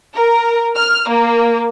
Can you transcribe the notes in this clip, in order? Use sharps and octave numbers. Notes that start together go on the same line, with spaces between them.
A#4
F6
A#3